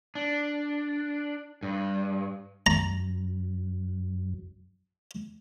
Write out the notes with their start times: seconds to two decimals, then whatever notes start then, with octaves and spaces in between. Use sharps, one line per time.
0.15 D4
1.63 G2
2.66 F#2 A#5